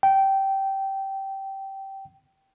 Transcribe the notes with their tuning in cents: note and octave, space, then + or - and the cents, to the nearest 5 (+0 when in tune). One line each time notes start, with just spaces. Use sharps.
G5 -15